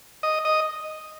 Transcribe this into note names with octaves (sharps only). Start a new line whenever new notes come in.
D#5
D#5